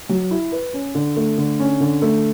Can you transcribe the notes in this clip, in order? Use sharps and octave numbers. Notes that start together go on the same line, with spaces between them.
F#3
E4
B4
C#4
D3
A3
D3
C#4
D3
A3